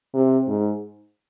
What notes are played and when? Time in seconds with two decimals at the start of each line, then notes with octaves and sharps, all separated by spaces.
0.14 C3
0.48 G#2